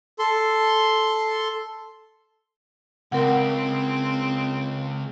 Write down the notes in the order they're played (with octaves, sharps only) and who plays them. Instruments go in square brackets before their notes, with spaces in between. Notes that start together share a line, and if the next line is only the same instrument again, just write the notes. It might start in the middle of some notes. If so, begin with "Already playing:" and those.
[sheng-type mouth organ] A4 C6
[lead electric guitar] C#2 [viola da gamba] C4 [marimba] A#4 F#5